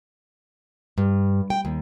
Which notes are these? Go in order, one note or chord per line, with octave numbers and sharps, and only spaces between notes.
G2
G5
D#2